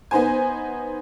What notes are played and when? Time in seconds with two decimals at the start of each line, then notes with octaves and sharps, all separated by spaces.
0.11 B3 D#4 C5 G#5